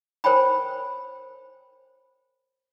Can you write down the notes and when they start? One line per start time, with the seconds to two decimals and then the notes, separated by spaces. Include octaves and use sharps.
0.24 A#4 C5 C#5 G5 G#5 B5